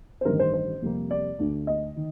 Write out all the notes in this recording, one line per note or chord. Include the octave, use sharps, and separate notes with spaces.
C5
A1 G2 D#3 A#4
C5
C5
F2 C3 G3 A#3
D5
D2 D3 A3
D#5
D#3